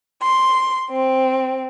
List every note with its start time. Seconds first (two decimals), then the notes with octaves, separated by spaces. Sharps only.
0.22 C6
0.90 C4